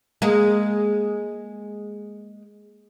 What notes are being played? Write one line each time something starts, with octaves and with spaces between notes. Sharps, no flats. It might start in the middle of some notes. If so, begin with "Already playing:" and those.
G#3 A#3